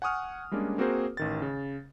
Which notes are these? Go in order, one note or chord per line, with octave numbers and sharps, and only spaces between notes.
F#5 G#5 C#6 D#6 F6
G3 G#3 A#3 C#4 D4
A#3 C4 F#4 G#4 A#4 C5
A1 D#3 A6
C#3